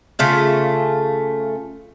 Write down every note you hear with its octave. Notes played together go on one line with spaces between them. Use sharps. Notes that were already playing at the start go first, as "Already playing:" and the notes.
C#3 A3 F4 E5